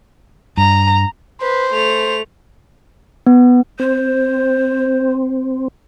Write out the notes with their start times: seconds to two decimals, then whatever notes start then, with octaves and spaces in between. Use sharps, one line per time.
0.57 G2 A#5
1.42 B4 C5
1.73 A3 F7
3.27 B3
3.80 C4 C5